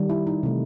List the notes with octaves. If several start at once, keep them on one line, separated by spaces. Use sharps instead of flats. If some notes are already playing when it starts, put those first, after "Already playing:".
Already playing: D#3 G3
E4
D#4
C3 E3 A3